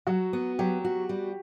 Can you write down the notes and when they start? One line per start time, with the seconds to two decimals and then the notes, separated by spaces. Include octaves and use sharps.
0.07 F#3 F#4
0.33 B3
0.59 F#3 G4
0.85 F#4
1.09 G3